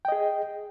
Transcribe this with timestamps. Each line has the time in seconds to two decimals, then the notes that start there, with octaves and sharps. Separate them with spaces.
0.05 G5
0.08 D#5
0.12 G#4